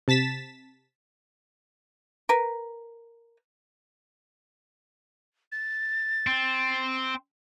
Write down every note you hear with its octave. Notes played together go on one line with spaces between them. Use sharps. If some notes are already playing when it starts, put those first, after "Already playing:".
C3 A5 A6 B6 E7
A#4 B4
A6
C4